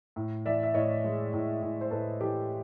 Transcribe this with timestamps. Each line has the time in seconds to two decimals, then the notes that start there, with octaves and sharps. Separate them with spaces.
0.16 A2
0.46 E3 D5 E5
0.63 E5
0.74 A2 C#5 D#5
1.04 G#3
1.33 A2
1.62 A2
1.81 C5
1.91 A2 A4 B4
2.21 E3 G4 A4